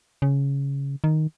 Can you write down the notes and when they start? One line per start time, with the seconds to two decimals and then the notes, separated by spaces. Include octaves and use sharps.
0.22 C#3
1.04 D#3